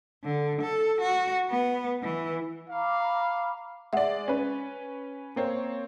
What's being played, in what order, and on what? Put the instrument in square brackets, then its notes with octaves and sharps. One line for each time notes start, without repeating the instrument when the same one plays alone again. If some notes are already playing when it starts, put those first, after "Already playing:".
[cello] D3
A4
F#4
B3
E3
[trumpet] F5 [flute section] A#5 B5 D6
[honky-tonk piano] G#3 D5 [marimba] E5 F#5
[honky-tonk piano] C#4 B4
A#3 C4 C#5